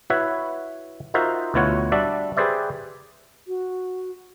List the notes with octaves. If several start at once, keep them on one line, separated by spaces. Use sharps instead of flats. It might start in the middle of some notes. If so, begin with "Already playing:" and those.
E4 F#4 B4 C#5 E5
D#4 F4 F#4 A#4 C5 E5
D2 B2 E4 F4 C#5 F#5
G3 D4 F#4 D5 E5
G4 G#4 B4 C5 D5 E5
F#4